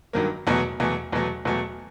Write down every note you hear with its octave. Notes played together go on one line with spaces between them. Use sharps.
G2 D#3 F#3 A#3
E2 B2 F#3 A3
E2 B2 F#3 A3
E2 B2 F#3 A3
E2 B2 F#3 A3